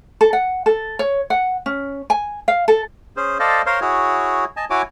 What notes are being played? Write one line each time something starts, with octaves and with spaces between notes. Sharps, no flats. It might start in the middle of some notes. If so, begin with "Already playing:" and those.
A4
F#5
A4
C#5
F#5
C#4
G#5
F5
A4
C#4 G#4 C5
A4 C5 D5 D#5 F5
A#4 C5 C#5 F5 C6
E4 F#4 G#4 C#5
D#5 G#5 A5
E4 F#4 C#5 G#5 D6